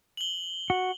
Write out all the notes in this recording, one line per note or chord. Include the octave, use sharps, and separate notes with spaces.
F#7 G7
F#4